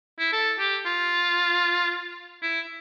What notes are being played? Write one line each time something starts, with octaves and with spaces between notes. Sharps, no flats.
E4
A4
G4
F4
E4